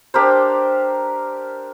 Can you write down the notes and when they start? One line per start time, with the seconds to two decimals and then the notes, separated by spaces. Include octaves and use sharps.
0.14 D4 G4 A#4 C5